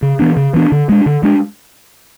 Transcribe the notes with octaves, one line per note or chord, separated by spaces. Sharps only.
C#3
E3 B3 D4
C#3
E3 B3 D4
D3
G#3 D4
D3
G#3 D4